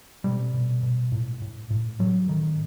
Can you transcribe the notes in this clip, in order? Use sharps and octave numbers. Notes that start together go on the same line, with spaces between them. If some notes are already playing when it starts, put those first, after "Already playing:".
B2 G3
B2
B2
A2
A2
A2
A2 F#3
A2 D#3